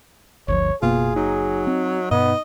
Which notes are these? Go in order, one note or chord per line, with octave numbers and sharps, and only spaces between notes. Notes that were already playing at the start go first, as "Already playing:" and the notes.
G1 D2 F3 C#5
F#1 B2 A#3 F4 G#4
F#3 D#4
C4
G2 B2 B3 D#5